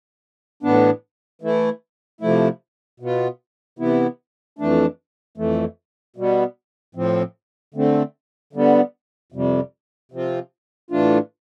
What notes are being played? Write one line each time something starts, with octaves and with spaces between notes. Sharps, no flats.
A2 E3 B3 D4
E3 A3 E4
C3 F3 A3 E4
B2 B3 F4
C3 E3 B3 E4
F2 E3 A3 D4
F2 E3 A3
B2 G3 B3
A2 F3 C4
D3 A3 C4
D3 G3 B3
F2 C3 G3
C3 F3 C4 F4
A2 E3 A3 D4 F4